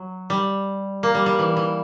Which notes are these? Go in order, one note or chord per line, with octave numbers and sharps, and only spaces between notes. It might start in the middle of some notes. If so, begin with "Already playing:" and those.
Already playing: F#3
G3
A#3
G3
G3
E3
E3